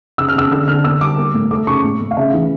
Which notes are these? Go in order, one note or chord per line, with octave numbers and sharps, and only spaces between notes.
C#3 E6
F6
C#3 E6
D3 E6
D3 F6
A#3 E6
G3 D6
A#3
A2
A3 D6
C#3 C#6
A2
A2
F5
C#3 E5
E3